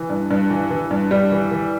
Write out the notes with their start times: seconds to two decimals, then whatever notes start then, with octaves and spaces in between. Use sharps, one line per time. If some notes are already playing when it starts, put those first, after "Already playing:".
Already playing: E3
0.09 G2
0.30 G2
0.50 E3
0.70 E3
0.91 G2
1.11 G2 G3
1.32 E3
1.51 E3